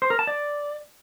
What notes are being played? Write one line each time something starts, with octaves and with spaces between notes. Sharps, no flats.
C5
A#4
A5
D5